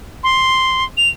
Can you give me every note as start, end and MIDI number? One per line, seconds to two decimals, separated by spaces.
0.23 0.84 84
0.97 1.09 101